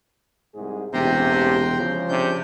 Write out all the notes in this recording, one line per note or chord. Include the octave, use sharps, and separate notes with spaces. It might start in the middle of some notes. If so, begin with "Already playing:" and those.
C2 G#2 G#4
E1 A1 C3 G4 G5 A#5 C6
C#3 F3
C3 D4 G6